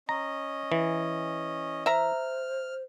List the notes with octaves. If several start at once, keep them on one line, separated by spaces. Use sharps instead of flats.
C#4 D#5 A#5
E3
C5 E5 A#5 F6